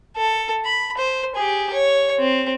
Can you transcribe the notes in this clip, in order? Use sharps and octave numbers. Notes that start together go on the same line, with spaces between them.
A4
B5
C5
G4 G#4
C#5
C4